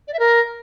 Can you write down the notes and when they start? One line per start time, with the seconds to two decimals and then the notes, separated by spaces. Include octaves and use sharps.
0.07 D5
0.13 E5
0.19 A#4